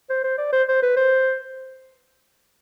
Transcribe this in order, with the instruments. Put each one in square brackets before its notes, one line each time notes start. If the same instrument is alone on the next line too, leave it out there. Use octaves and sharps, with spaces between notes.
[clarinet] C5
C5
D5
C5
C5
B4
C5